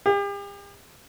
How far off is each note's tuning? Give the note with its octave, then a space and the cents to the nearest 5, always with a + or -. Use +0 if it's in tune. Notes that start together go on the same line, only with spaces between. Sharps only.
G4 +40